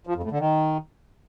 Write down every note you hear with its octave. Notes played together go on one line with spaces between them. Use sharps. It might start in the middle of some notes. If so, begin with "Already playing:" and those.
F3
F2
A2
D3
D#3